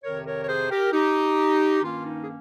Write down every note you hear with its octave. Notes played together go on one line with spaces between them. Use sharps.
F2 C3 D#3 A#4 C#5
A#4 C#5
C#5
G#4 C5
G4 A#4
D#4 G4
G2 D#3 A#3 C#4 F4
D#4
G#4